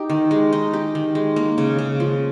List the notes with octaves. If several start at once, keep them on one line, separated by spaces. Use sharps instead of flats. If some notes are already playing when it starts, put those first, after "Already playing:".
Already playing: D#4 G4
D#3
G#3
D#4
G4
D#3
G#3
A#3
C#3
C#3
F3